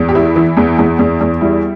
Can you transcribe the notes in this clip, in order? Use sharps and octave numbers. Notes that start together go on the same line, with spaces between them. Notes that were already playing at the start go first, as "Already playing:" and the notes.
Already playing: E2
G4
E3 E4
E3
E2
E2
E2
E2
G3 E4